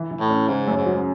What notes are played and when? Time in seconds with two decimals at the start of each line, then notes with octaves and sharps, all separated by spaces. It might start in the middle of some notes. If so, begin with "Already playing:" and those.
Already playing: E3
0.11 E3
0.20 A2
0.29 C#4
0.48 G#2 C#3
0.68 F#2
0.77 G#2
0.86 F#3